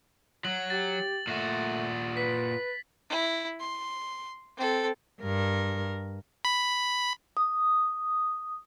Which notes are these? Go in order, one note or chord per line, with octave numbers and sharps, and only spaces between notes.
F#3 F#7
G4 A6
A#2 A3 F#4
B4 B6
E4
C6
C4 A4
G2 A#4
B5
D#6